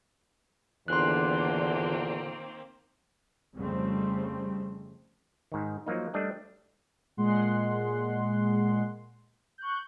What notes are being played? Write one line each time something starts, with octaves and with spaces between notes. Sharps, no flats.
E2 A#2 D3 D#3 A#3 C4 C6 F#6
F2 C#3 G3 A3 C4
G#2 D#3
F3 F#3 A#3 D#4
G3 A3 D4 D5 D#5
A#2 G#3 F#5 C6
C#6 F#6 G6